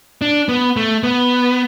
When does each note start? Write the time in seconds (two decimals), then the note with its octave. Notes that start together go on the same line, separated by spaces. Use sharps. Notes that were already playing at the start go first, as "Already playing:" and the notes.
0.22 D4
0.49 B3
0.76 A3
1.03 B3